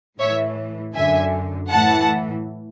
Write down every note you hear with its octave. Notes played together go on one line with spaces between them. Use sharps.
A2 E3 C#5 E5
F#2 D3 E5 G#5
A2 E3 F#5 A5